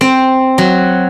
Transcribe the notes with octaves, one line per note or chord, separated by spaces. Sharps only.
C4
F#3